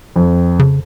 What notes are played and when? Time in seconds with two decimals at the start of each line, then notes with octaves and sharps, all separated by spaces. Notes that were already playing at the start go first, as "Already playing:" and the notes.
0.16 F2
0.59 C#3